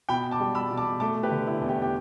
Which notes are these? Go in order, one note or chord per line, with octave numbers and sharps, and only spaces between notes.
B2 G5 B5
A5 D6
G3
B5 E6
B2
A5 D6
A3 A5 D6
G4 B4
D3
E4
E2
G4
G4